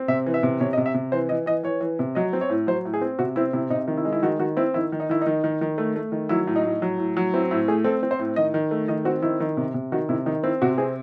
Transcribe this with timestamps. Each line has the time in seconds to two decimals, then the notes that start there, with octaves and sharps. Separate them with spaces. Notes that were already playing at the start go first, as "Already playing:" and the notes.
Already playing: C4
0.08 C3 E5
0.26 E3
0.34 E5
0.43 C3
0.60 C3 C#5
0.73 D#5
0.77 C3
0.86 E5
0.94 C3
1.12 E3 C5
1.29 E3 D#5
1.46 E3 D#5
1.63 E3 C#5
1.81 E3
1.99 C3
2.15 F#3 D#5
2.33 C4
2.41 C#5
2.50 A2
2.67 F#3 C5
2.85 A2
2.94 G#4
3.01 C4
3.19 C3 F#4
3.36 C4 E4
3.53 C3 E4
3.70 C3 D#4
3.88 D#3
3.97 E4
4.05 G#3
4.12 E4
4.23 D#3 F#4
4.39 D#3 F#4
4.57 C4 E4
4.74 D#3 E4
4.92 D#3
5.00 D#4
5.10 D#3 E4
5.21 D#4
5.26 D#3
5.44 D#3
5.61 D#3
5.78 A3
5.96 A3
6.12 D#3
6.29 F#3 E4
6.47 A2
6.56 D#4
6.65 A2
6.82 F#3
6.98 A2
7.17 F#3
7.34 C4 E4
7.51 A2 E4
7.68 A3 G#4
7.84 C4 A4
8.03 C4
8.11 C5
8.19 A2
8.36 D#3 D#5
8.54 D#3
8.71 A3
8.88 D#3 D#5
9.05 C4 F#4
9.22 D#3 E4
9.40 D#3
9.57 C3
9.74 C3
9.92 D#3 F#4
10.09 C3 E4
10.26 D#3 D#4
10.43 C4 E4
10.62 C3 F#4
10.78 C4 G#4